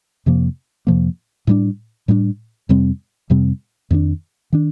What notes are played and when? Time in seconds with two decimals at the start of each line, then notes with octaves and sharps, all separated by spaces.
0.26 F2 C3 F3 A#3
0.87 F2 C3 F3 A#3
1.47 A2 G3 A#3 D4
2.08 A2 G3 A#3 D4
2.69 F2 C3 G3 C4
3.30 F2 C3 G3 C4
3.90 F2 D#3 A#3 D4
4.52 D#3 A#3 D4